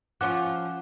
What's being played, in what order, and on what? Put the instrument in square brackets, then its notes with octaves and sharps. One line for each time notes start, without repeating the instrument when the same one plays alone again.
[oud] F3 C#4 F4 [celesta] F#5 D6 F#6